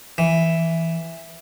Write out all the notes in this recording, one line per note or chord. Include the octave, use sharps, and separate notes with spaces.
E3